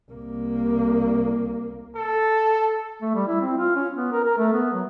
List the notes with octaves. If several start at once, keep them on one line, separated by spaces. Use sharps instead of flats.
C2 A#3
A4
A3
G3
E4
C4
F4
C#4
B3
A#4
A#4
A3
B3
F#3